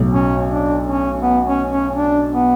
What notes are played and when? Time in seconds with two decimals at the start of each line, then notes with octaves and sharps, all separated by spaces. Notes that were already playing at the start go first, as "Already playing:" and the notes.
Already playing: B1 A2 F#3
0.13 C#4
0.50 D4
0.86 C#4
1.22 B3
1.47 C#4
1.71 C#4
1.96 D4
2.32 B3